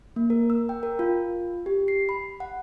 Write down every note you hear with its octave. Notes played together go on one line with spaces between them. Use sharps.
A#3
A#4
E6
G5
A#4
F4
G4
C7
B5
F#5